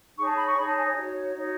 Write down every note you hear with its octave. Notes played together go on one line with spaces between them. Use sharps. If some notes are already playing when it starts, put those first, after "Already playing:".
D#4 G#4 C#5 C#6
A5
B5
C#6
D#4 G#4 C#5 B5
A5
G#5
C#5
D#4 F#4 C#5
D#4 F#4 C#5